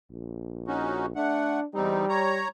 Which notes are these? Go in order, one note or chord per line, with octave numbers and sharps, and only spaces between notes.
A#1
C#4 D#4 F#4
A3 D4 F#5
E2 G3 C4 D#4
C#5 A#5